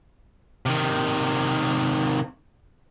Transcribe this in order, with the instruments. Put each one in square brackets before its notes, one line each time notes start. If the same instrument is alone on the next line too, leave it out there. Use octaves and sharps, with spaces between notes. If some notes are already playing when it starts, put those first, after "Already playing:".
[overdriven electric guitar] C3 D#3